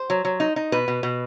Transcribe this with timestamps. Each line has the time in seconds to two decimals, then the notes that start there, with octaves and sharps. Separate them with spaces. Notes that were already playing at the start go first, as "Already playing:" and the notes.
Already playing: C5
0.10 F#3
0.25 F#3
0.40 D#4
0.56 D#4
0.72 B2 B4
0.88 B2
1.03 B2